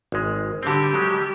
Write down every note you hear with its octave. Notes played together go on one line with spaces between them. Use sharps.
G#1 G#3
D3 G3 C4 G4
F#3 G#3